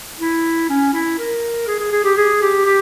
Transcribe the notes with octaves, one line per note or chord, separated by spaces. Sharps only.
E4
C#4
E4
A#4
G#4
G#4
G#4
G4
G#4
G4
G4